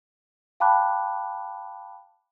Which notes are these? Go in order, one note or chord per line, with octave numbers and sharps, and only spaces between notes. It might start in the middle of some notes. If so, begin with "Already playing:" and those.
F5 G5 A5 B5 D6 F#6